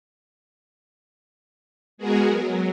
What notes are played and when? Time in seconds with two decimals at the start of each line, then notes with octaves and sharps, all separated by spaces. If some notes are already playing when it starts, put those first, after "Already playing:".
1.98 G#3 B3 F#4 G#4 A#4
2.29 F#3